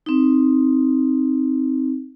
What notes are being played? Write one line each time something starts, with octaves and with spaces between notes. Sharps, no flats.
C4 D#4